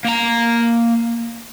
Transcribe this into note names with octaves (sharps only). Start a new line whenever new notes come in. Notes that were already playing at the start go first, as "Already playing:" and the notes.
A#3 A#5